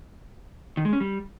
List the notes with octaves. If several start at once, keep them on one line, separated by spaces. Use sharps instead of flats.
D#3
G#3
C#4
G3